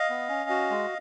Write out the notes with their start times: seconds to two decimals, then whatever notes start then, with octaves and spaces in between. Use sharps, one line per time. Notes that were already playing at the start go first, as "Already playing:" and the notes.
Already playing: D#5 F5
0.10 B3
0.29 C#4
0.50 F#4
0.70 G#3